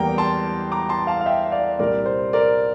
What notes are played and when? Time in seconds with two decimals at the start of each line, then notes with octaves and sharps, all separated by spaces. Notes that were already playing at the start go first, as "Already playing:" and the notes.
Already playing: E2 E3 G3 A#3 G5 A#5
0.18 A5 C6
0.72 A#5 D6
0.89 A5 C6
1.07 F5 A5
1.21 F5
1.26 E5 G5
1.52 D5 F5
1.79 C2 A#2 G3 A#4 D5
2.06 C5
2.33 A#4 D5